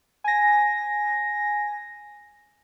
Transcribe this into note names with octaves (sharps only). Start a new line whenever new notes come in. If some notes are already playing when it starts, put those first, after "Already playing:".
G#5 A#6